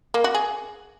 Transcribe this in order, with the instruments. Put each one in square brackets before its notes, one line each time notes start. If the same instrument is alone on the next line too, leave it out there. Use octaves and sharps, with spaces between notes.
[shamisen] A#3
F#4
G#4